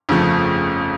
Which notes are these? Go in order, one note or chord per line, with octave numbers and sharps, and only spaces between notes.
G1 F2 C#3 F3 A3